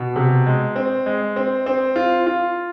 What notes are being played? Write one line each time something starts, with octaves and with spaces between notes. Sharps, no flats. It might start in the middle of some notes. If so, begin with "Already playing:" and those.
Already playing: B2
C3
G#3
C4
G#3
C4
C4
F4
F4